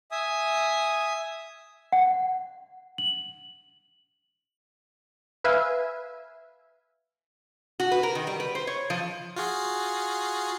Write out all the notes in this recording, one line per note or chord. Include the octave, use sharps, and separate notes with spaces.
E5 G#5 D#6
F#5
F#7
B4 E5 F5 G#5
F#4
B4
A#4
D#3
G3
B4
C5
C#5
F3
F4 F#4 G#4